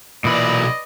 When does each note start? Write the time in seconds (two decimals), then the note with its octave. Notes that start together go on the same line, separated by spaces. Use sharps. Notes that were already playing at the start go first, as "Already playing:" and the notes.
0.24 B1 A#2 E3 B4 D5 D#5 B5